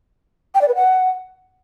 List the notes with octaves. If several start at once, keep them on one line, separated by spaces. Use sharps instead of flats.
G5
D5
B4
F#5